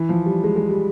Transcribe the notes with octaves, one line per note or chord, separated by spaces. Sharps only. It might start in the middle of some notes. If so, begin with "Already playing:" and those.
Already playing: E3
F3
G3
G#3
G#3
G3